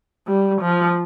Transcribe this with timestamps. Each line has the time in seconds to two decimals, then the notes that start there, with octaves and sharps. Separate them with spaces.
0.27 G3
0.62 F3